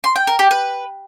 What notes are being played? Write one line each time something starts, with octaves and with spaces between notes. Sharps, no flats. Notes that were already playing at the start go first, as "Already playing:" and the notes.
C6
G5
A#4
G4
B4